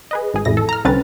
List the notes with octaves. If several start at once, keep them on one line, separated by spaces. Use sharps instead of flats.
G#4 B4 D#5
G#1 G#4
A1 F2 A2 E4 A#6
A4
A#5 F6
C2 D3 C4 C#4 B4 A6